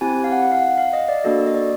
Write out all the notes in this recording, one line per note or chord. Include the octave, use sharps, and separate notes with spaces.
C4 E4 G4 G#5
F5
F#5
F#5
F5
F5
D#5
D5
A#3 D4 F#4 A4 D#5
D#5
D5